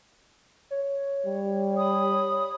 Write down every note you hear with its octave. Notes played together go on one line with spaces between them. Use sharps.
C#5
G3
B5 D#6